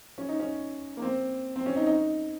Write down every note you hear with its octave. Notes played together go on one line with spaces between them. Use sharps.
C#4
D#4
C#4
A#3
C4
C4
C#4
D#4
D#4